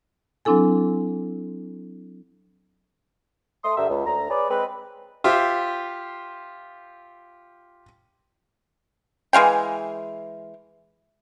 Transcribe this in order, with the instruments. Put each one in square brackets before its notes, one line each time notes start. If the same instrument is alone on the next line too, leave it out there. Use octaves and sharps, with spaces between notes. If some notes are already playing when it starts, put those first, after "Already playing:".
[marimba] F#3 C4 D4 E4 A4 G#5
[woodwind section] A3 C6 D#6
G2 D3 G4 A#4 E5
C#2
D2 A#5
G#4 B4 C#5 D5
G#3 C4 B4
[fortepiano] F4 G4 C5 E5
[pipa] E3 G#3 F5 G5